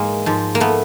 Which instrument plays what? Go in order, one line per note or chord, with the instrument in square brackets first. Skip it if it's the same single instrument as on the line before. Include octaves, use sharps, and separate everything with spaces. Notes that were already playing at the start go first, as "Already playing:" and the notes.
Already playing: [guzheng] G#2 E3 G#3 A#3
G#2 F3
A#3
A3 B3